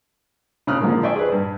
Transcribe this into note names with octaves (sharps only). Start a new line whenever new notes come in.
C#3 C4 B5 D#6 F6 F#6
D3 F3 G#3 A#3
C5 D5 E5 G5 G#5 C#6
G#4 B4
G2